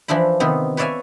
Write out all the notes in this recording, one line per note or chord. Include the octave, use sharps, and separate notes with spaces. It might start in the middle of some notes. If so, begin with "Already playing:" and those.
E3 F3 D4 E4 B5
C3 D#3 B3
B4 C#5 D5 E5 F5 G#5